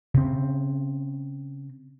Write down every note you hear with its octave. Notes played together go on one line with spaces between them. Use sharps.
C#3 C4